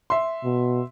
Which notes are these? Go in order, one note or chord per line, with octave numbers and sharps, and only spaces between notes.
E5 C6
B2